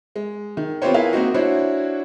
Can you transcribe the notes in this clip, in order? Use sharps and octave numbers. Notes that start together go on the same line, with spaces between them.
G#3
D#3
B3 C4 F4 G4 C5 C#5
E4 G#4 A#4 B4 E5 F5
A#3 C4 D#4 F#4
D4 E4 F#4 C5 C#5